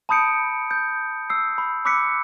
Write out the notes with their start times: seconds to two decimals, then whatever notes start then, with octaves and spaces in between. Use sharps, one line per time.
0.09 A5 B5 D#6 G6 C#7 D7
0.71 G6
1.30 E6 C7
1.58 B5
1.85 B5 D6 E6 F#6 B6 C#7